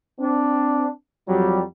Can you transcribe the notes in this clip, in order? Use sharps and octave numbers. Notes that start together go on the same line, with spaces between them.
C4 D4
F2 F#3 G3